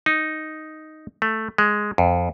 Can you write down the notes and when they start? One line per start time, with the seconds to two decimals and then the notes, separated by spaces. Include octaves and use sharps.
0.06 D#4
1.22 A3
1.58 G#3
1.98 F2